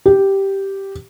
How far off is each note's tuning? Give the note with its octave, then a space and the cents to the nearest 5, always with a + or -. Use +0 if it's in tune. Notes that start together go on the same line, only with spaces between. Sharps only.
G4 -5